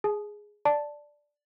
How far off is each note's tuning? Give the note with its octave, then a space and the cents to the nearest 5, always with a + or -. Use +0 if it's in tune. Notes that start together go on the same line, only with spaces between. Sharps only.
G#4 +0 A5 -45
D5 +0 A5 +0